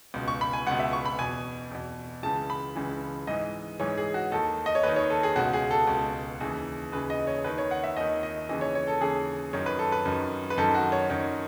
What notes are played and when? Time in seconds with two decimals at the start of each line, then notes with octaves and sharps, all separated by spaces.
0.14 C#2 B2
0.28 C#6
0.41 B5
0.53 G#5
0.67 C#2 B2 F#5
0.80 E5
0.93 C#6
1.05 B5
1.18 E2 B2 G#5
1.71 E2 B2
2.23 C#2 C#3 E3 A5
2.50 B5
2.75 C#2 C#3 E3
3.27 G#2 E3 D#5
3.80 G#2 E3 C#5
3.97 G#4
4.14 F#4
4.32 D#2 D#3 A4
4.66 D#5
4.75 C#5
4.83 D#2 D#3 B4
4.96 C#5
5.10 A4
5.23 G#4
5.36 C#2 B2 F#4
5.53 G#4
5.71 A4
5.87 C#2 B2
6.40 D#2 C#3 E3
6.92 D#2 C#3 E3 B4
7.10 D#5
7.27 C#5
7.44 D#2 D#3 B4
7.58 C#5
7.71 F#5
7.84 E5
7.96 D#2 D#3 D#5
8.23 D#5
8.49 D#2 C#3 E3 D#5
8.61 C#5
8.75 C#5
8.88 A4
9.01 D#2 C#3 E3 G#4
9.53 F#2 D#3 C#5
9.66 B4
9.79 A4
9.92 B4
10.05 F#2 D#3
10.50 B4
10.57 F#2 D#3 A4
10.75 F#4
10.92 C#5
11.10 F#2 D#3 C#5